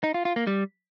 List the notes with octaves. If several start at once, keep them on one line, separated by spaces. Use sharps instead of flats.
D#4
F4
F4
A#3
G3